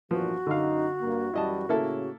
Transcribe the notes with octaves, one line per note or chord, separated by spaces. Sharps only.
G2 A#2 E3 F3 B3 F#4
F#2 D3 D#4 F5
G2 A#3
F#2 E3 G3 E4 D#5 A5
A2 C#3 A#3 E4 A4